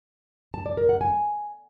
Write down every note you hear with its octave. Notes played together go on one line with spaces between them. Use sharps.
A5
D5
A#4
F#5
G#5